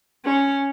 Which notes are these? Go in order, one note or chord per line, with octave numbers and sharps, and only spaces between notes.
C#4